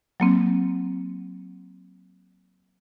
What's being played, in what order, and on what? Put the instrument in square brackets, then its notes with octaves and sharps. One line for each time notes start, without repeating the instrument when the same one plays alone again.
[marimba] F#3 A#3 C4